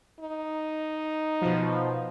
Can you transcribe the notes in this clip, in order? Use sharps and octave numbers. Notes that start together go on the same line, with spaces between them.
D#4
B2 F3